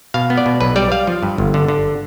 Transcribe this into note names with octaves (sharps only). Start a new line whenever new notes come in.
B2 F5
B3
D5
B2
B1 B4
G3 D5
G3 F5
F3
G2
G1
D3
D3